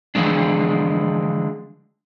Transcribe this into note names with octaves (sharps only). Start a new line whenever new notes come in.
D3 E3 F3 G#3 D4